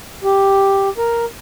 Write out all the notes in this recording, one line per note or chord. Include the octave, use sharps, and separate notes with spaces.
G4
A#4